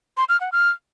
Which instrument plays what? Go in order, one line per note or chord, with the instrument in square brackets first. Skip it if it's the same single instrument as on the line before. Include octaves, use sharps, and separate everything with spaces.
[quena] C6
F6
F#5
F6